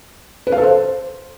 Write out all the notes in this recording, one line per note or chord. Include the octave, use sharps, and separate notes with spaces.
B4
F5
A4
C5